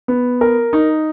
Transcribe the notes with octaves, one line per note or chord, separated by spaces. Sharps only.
B3
A#4
D#4